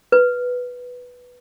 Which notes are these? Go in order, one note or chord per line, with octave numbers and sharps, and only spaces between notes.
B4